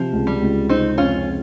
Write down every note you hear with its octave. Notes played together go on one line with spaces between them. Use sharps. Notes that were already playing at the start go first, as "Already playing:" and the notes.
Already playing: C3 F3
C#2
G3
C#2
C3 C4 D#4
F2 C#4 F4